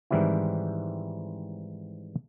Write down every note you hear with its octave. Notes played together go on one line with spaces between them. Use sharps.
G#2 D#3 E3 G3 C4 E4